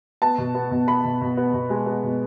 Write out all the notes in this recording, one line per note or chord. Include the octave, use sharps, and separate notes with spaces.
B3 A5
B2
B3
B2
B3 B5
B2
B2
B3
B2
G#3
B3
B2